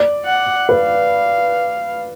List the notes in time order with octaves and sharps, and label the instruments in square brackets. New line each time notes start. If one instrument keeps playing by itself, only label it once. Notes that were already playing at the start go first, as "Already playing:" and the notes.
Already playing: [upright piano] D5
[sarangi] F#5
[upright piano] B4 [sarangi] F5